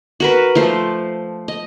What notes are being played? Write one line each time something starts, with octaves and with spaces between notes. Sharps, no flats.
F#4 A#4 B4
F3 A3 C5
D#5